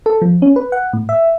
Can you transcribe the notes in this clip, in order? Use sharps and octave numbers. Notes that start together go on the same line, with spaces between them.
A4
F3
C#4
B4
F#5
A2
E5